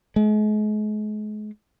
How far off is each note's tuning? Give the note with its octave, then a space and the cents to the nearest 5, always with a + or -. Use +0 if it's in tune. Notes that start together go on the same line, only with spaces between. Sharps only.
G#3 +40